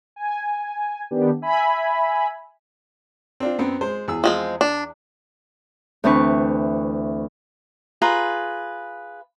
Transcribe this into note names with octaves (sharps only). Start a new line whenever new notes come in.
G#5
D#3 B3 D4 G4
E5 G#5 B5
C4 D4 F4
F#2 B3 C4
G#3 C5
E2 G#4 E6
F3 G#3 C4
D4
D2 E3 C4 D4 B4 C#6
F4 G#4 B4 A#5